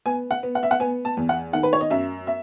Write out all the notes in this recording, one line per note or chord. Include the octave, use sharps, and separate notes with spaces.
B3 G#5
F#5
B3
F#5
E5
F#5
B3 G#5
A5
E2
F#5
D#3 F#5
B4
C#5
D#5
F#2 E5
E5